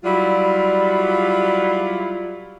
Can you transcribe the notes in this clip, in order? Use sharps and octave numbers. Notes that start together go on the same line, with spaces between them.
F#3 G3 E4 F4